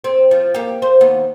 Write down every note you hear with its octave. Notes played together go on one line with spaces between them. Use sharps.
C4
F3
A#3 G4
C5
D#2 B3